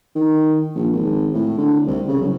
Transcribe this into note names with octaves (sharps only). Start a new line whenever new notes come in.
D#3
A#1
G#1
A2
D3
C2
C#3
F#2